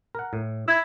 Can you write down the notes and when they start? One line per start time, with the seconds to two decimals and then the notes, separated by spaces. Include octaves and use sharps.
0.15 A#4 F#5
0.33 A2
0.68 E4 E6 G#6